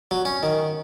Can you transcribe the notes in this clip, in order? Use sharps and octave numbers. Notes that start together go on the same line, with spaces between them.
F#3
C#4
D#3